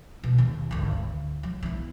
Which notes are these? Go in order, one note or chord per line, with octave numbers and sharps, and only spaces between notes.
B2
D#2
G#1 D2
D2
F#3
B3 E4